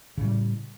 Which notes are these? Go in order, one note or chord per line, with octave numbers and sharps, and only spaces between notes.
A2 C#3 G3